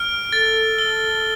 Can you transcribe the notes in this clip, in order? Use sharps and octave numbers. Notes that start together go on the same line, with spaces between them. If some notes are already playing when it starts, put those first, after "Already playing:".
Already playing: F6 D7
A4 A6
G7